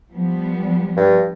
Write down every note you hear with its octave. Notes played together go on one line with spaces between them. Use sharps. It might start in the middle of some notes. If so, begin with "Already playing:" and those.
F3 G3 B3
G2